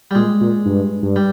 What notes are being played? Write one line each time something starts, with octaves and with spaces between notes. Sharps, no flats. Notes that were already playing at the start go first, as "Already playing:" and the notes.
G3
A#2 G#3
A#2
G2
G2
G3